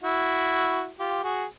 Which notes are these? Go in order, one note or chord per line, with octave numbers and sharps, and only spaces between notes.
E4 F#4
F4 G4
F#4 G#4